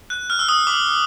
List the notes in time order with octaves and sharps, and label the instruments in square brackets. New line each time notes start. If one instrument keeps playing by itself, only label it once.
[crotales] F#6
F6
E6
D#6
D6